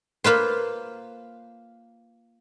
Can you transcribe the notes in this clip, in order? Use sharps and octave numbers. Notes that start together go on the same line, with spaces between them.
A#3 F4 B4 C5